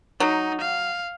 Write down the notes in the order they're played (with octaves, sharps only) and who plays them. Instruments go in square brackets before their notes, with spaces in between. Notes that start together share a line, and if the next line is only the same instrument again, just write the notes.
[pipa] F#3 [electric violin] D#4
[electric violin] F5